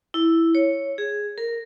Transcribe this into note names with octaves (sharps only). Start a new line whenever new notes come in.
E4
C#5
G#4
A#4